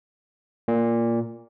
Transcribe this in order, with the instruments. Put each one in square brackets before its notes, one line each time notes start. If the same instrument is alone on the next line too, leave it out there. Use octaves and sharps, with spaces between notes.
[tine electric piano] A#2